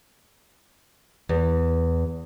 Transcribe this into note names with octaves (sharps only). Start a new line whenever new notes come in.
E2